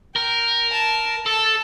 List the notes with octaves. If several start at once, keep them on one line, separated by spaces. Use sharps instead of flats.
A#4 G5
A5
A4 A5